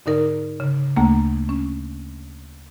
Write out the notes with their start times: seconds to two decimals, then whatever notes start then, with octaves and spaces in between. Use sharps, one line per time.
0.06 G#2 D3 D#4 A#4
0.60 C#3
0.97 D2 A3 A#3
1.49 C#4